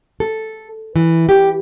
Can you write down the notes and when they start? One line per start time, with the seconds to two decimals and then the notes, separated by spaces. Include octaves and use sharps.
0.20 A4
0.96 E3
1.29 G4